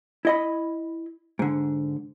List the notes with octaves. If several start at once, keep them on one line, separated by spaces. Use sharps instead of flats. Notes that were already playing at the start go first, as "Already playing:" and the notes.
E4 D#5 B5
G#2 D3